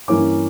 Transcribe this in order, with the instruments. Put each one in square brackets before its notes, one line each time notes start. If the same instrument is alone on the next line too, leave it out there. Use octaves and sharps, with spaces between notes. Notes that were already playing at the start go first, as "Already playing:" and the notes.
[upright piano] G2 E3 A#3 C#4 D6